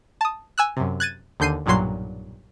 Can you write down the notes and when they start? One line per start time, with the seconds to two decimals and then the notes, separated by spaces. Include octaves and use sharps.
0.21 A5 D#6
0.58 G#5 E6 F#6
0.77 F#2 C3
1.00 F#6 G#6 A6 D#7
1.40 D#2 D3 G6 C7 D#7
1.66 B1 G2 A#2 F#3 C6 C7